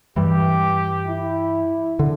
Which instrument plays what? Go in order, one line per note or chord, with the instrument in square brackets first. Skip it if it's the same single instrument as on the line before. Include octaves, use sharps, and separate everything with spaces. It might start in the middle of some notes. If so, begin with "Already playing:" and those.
[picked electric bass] G2 E3 G3 [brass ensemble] G4
[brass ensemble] E4
[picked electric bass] D3